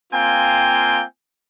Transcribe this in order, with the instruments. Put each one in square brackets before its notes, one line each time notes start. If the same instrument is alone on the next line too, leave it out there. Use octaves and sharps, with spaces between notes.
[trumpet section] A#3 C4 F4 G5 G#5